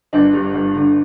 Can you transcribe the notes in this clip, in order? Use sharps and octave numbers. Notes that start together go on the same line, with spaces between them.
G1 D4
G2
G1
D3